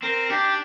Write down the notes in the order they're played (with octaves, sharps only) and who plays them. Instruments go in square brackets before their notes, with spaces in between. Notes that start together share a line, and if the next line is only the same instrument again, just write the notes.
[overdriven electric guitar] C4 [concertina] A#4
[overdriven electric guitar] D4 [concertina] G4